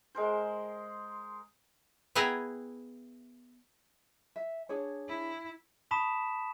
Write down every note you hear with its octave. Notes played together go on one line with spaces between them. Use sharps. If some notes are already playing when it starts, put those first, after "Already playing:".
G#3 A#4 C5
B3 E4 G#4 G5 G#5 A#5
E5
D4 G#4 C#5
E4
A5 B5 C#6 D#6 B6 E7